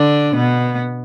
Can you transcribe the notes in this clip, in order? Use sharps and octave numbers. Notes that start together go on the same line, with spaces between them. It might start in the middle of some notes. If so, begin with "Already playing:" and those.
Already playing: D3 D4
B2 B3